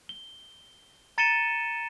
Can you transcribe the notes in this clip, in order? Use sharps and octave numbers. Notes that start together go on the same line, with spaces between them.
G7
A#5 A6 C#7 D#7 E7 G7